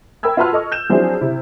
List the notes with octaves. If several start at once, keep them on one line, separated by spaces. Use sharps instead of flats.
A#4 G5 B5 E6 G#6
F4 F#4 B4 A5 C6 F6
A4 D#5 C#6
G6 E7
F3 F#3 C4 D4 E4 G#4
C3 E4